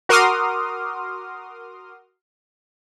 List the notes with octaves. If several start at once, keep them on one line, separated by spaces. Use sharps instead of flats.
F#4 A#4 C6 D6 D#6 F6